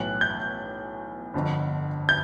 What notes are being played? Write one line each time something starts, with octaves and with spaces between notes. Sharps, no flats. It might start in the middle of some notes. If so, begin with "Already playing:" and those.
Already playing: B1 A2 E3 F#6
G6
G1 F2 D3
G6